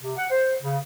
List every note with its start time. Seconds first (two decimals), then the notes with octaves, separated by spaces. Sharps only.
0.03 C3
0.17 F#5
0.31 C5
0.61 C#3